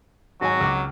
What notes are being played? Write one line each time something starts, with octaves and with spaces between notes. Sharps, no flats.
G#1 F#3 F#4 G#5
C#2 D6